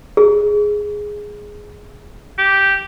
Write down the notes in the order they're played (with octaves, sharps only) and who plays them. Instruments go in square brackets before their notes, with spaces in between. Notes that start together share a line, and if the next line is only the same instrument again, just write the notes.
[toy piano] G#4
[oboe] G4